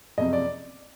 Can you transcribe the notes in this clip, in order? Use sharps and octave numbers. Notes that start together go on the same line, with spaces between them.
F#1 F2 C3 D#5
D5